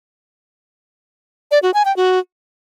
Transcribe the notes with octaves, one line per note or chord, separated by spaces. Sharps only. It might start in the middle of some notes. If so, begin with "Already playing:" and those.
D5
F#4
G#5
G5
F#4